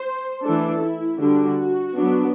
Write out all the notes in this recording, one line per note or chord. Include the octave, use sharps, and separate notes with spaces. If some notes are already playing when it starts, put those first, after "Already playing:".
Already playing: C5
E3 A3 D4 A4
E4
D3 G3 D4 F#4
F#3 B3 D4